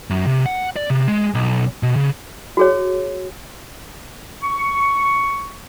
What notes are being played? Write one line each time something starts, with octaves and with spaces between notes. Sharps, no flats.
F#2
C3
F#5
D5
C3
G#3
B1
B2
C#3
F#4 G#4 C#5
C#6